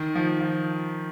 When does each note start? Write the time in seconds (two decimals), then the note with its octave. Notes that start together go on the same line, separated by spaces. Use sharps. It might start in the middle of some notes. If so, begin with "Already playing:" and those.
Already playing: D#3
0.15 F3
0.41 F3